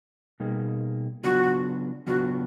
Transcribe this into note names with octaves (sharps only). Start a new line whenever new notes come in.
B2 G3 A#3 D#4 G#4
C#3 F#3 B3 D4 F4 F#4
C#3 F#3 B3 D4 F4 F#4